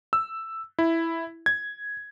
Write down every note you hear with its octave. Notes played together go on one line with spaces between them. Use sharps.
E6
E4
G#6